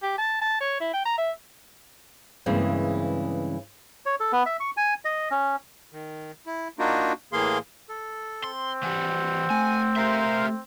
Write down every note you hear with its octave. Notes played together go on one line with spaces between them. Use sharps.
G4
A5
A5
C#5
E4
G5
A#5
E5
G2 C#3 E3 G#3 A#3 C4
C#5
A4
B3
E5
C#6
G#5
D#5
C#4
D#3
E4
A#3 D4 D#4 F4 F#4
A2 E3 A#3 G#4 F5 C6
A4
C4 C6
E3 G3 F#5
A3 G#5
G4 A#4 C5 E5 F5